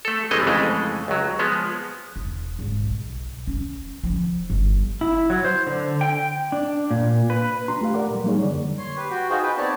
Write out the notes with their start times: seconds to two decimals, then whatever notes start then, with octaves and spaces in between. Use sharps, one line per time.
0.05 A3 A4
0.31 G1 E3 G#3 A3 C4 D#5
0.47 F2 C#3 E3 G#3 A3
1.08 C#2 F#3
1.39 F3 G#3 B3
2.16 E1
2.59 G#1
2.82 B1
3.47 C#4
4.04 F3
4.50 G1
5.01 E4
5.30 F#3
5.45 C5
5.67 D3
6.01 G5
6.52 D4
6.91 A#2
7.30 B4
7.68 D4 F4 A#5 C6
7.81 A3 G4 F5
7.94 A#4 D5 F#5 D6
8.10 A#2 G3
8.24 F#3 G3 A#3 D#4 G#4 C#5
8.42 F2 D3 D5
8.78 C#5 C6
8.96 G4 B4
9.10 F#4 G5
9.30 D#4 F4 F#4 G#4 C5
9.42 B4 G5
9.57 B3 C4 D#4 C#5 D5 A5